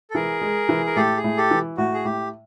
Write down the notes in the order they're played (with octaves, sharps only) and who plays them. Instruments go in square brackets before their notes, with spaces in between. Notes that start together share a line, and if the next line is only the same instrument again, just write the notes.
[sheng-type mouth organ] A4
[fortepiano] E3 [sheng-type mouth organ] G#4 A#4
[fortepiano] G#3
E3
[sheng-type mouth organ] A#4
[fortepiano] A2 [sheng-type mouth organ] G4 A4
[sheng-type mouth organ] G#4
[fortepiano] A2
[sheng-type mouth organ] G4 A4
[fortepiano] E3
[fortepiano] A2 [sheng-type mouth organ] F#4
[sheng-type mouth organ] G#4
[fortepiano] A2 [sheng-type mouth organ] G4